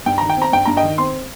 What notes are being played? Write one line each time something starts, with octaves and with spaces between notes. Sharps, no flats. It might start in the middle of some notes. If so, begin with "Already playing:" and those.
G2 G5
D#3 A#5
G5
C4
A#5
G2 G5
G2 A#5
D#5 G5
D#3
C4 C6